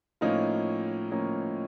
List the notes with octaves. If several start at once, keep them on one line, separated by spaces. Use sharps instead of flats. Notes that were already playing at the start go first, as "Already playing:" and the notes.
A2 F3 A#3 C#4 D#4 F4
A2 F3 A#3 C#4